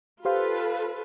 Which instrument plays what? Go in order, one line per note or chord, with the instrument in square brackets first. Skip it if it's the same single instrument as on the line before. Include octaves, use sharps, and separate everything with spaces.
[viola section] F4 A4 B4 [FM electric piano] G4 C5 F5